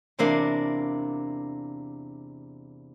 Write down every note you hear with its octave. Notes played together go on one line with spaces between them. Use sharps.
E2 C3 A#3 D4 C6